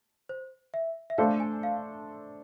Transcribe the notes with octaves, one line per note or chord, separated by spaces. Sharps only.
C5
E5
E5
A3 D4 A4 C5 F5
G#5
F5